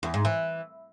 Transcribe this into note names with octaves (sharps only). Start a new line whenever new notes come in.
E2
G#2
E3